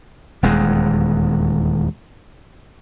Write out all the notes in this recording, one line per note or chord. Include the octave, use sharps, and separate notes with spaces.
D#1 E2 G#3